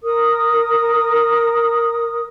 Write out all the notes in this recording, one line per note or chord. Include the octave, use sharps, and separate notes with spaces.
A#4 D#6